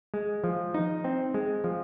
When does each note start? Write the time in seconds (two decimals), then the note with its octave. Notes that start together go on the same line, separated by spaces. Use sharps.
0.14 G#3
0.44 F3
0.74 D#4
1.04 C4
1.34 G#3
1.64 F3